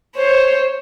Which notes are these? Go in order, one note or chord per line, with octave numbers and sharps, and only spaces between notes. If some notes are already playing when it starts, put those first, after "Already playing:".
C5 C#5